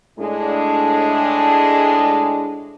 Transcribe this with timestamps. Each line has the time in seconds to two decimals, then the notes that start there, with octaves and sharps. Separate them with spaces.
0.19 A2 G#3 D4